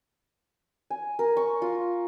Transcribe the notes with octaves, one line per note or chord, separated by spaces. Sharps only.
G#5
A#4
C#6
F4